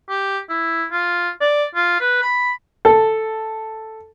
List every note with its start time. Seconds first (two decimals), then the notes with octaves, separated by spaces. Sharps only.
0.09 G4
0.49 E4
0.92 F4
1.41 D5
1.75 F4
2.00 B4
2.22 B5
2.85 A4